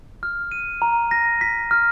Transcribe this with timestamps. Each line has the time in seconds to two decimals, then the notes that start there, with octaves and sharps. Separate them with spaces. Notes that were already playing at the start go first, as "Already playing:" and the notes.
0.23 F6
0.52 D#7
0.82 A#5
1.11 A#6
1.41 B6
1.71 F6